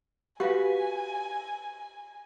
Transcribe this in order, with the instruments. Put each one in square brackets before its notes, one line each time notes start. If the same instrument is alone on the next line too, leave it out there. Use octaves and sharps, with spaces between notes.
[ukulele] F#4 B4 [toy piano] G4 F5 [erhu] G#5